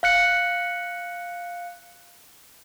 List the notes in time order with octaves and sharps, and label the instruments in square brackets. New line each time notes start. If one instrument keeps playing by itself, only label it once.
[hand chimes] F5 F#6 C#7